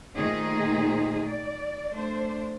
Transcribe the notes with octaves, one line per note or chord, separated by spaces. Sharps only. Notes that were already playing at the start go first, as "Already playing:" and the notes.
A#2 D#3 A3 D#4 G#4 C5
D5
A3 D4 C5